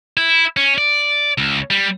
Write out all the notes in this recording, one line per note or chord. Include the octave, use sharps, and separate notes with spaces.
E4
C#4
D5
C#2
G3